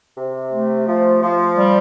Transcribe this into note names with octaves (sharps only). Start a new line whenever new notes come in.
C3
A3
F3
F3
G3